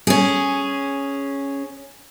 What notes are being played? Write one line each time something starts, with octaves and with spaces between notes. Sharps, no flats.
C#4 G#4